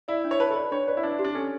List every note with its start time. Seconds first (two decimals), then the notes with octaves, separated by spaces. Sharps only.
0.08 E4 D5
0.25 D4
0.31 C#5
0.40 B4 A5
0.50 A4
0.55 B4 D5
0.72 D4 C#5
0.87 B4 D5
0.97 E4
1.03 D4 D5
1.19 G4
1.24 D4
1.35 C#4 A4